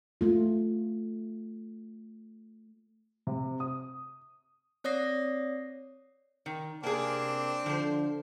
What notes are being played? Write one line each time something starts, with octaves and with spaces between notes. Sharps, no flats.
A3 F4
C3
D#6
C4 C#5 D5 D#6 A#6 C7
D#3
C3 A#3 C4 D4 G#4
D3 F3 C5